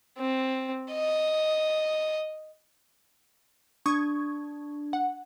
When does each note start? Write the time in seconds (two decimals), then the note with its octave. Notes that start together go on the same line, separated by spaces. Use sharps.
0.18 C4
0.92 D#5
3.86 D4 C#6 D#6 G#6
4.93 F#5